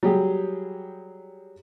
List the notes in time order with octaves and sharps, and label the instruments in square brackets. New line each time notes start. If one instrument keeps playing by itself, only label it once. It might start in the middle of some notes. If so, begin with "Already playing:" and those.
[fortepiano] F#3 G3 G4 G#4